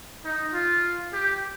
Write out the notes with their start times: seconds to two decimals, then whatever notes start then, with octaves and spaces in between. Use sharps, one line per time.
0.24 D#4
0.53 F4
1.13 G4